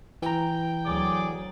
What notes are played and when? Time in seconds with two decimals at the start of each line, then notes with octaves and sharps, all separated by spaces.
0.22 E3 G5 A#5
0.86 D2 F#3 G#4 D5 D6